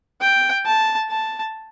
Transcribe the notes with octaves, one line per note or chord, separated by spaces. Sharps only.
G5
A5
A5